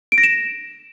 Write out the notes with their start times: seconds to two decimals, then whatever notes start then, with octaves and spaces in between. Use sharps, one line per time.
0.12 D7
0.18 A#6
0.23 E7